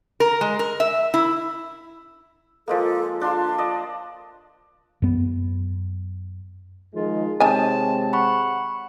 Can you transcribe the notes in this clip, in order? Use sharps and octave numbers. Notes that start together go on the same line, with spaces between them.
A#4
G#3
A#4
E5
E4
F3 G#3 A#3 A4
D4 F4 A5 C6
D5 D#5
F#2 B3
D#3 F3 G#3 F4
C3 D#3 G#3 C4 C#5 G#5 A5
F#5 B5 C#6